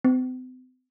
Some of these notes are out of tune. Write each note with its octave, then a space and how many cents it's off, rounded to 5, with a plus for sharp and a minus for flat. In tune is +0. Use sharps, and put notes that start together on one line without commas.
C4 -45